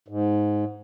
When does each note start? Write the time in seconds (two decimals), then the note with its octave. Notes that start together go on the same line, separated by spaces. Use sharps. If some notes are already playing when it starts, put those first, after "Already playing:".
0.08 G#2